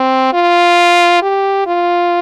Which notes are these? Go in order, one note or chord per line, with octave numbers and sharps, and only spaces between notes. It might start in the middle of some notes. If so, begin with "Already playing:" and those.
Already playing: C4
F4
G4
F4